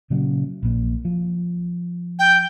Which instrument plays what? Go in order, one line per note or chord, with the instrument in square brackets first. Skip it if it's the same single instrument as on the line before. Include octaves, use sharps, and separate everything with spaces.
[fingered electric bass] A#2 C#3 F#3
A#1 A#2
F3
[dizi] G5